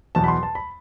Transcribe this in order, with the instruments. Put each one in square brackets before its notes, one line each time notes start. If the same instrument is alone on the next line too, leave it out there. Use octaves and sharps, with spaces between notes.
[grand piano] E2 B2 F#3 B3 A5
B5
C6
A5
B5